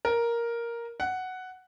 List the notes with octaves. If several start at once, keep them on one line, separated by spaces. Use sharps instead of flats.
A#4
F#5